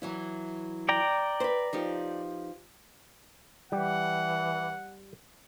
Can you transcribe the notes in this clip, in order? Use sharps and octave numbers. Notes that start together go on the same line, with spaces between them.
E3 F#3 E4
D5 G5 A#5
B4 C5
F3 D#4 G4
E3 G3 G4 F#5